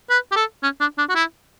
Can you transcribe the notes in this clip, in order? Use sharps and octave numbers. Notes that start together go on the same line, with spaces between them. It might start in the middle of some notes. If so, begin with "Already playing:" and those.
B4
G4
A4
C#4
D4
D4
F#4
E4